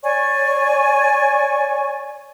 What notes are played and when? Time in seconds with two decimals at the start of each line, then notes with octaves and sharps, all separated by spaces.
0.02 C#5 D5 G#5 C#6